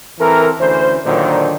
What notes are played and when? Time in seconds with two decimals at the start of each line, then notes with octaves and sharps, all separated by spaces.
0.19 E3 C4 A4 A#4
0.59 D2 E3 C#4 C5
1.05 A#2 D3 D#3 F#3 D4 C5